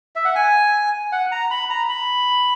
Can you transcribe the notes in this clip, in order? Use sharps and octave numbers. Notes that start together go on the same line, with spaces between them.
E5
F#5
G#5
F#5
A#5
B5
A#5
B5